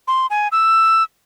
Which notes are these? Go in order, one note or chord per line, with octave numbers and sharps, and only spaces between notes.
C6
G#5
E6